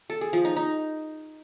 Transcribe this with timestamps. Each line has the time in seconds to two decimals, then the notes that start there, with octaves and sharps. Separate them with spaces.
0.10 A4
0.21 G#4
0.33 F3
0.45 D#4
0.56 D#4